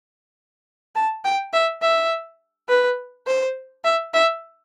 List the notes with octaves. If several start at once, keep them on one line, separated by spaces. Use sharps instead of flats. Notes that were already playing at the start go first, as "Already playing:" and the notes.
A5
G5
E5
E5
B4
C5
E5
E5